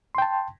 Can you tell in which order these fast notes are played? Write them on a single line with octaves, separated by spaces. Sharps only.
C6 G5 A5